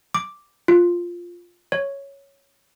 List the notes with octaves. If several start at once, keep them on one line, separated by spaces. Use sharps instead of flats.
D6
F4
C#5